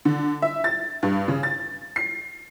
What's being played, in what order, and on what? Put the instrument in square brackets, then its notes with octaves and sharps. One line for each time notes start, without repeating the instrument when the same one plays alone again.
[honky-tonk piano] D3
E5
A6
G2
C#3
A6
C7